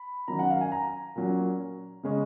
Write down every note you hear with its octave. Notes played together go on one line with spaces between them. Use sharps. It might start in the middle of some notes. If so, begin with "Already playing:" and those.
Already playing: B5
D#3 F#3 C#4 A#5
F#5
F5
G#5
A#5
A#2 F#3 C#4
C#3 G#3 C#4